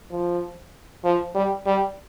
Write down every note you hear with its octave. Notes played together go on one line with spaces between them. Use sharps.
F3
F3
G3
G3